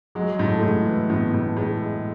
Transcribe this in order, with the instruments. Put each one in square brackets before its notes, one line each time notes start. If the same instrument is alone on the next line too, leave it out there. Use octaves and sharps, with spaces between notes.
[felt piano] F#3 [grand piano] G#3
[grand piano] A2
[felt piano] A3
[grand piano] A2 [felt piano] G#3
[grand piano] E3
[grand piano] A2 [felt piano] B3
[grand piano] A2
[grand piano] A2 [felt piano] G#3
[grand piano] G#3